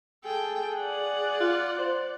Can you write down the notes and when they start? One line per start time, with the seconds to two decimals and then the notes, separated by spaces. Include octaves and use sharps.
0.25 G#4 A4 G5
0.76 D5 F#5
1.40 F4
1.78 C5